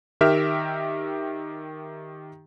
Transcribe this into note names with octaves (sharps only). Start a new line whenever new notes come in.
D#3 G4 A#4 E5 F6